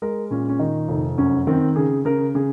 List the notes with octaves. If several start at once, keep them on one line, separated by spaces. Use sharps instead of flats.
G#3 A#4
A#2 C#4
C#4
D#3 D#4
F1
F#2 C#4
D#3 C4
C#3 G#4
C#3 A#4
C#3 G#4